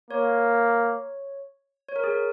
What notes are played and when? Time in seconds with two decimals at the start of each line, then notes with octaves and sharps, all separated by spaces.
0.10 A#3 C#5
1.88 C#5
1.96 A#4
2.04 G#4
2.11 A#4